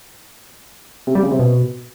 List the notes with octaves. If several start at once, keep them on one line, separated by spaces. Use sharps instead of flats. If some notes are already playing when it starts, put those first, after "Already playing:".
C3
G3
C#3
C3
B2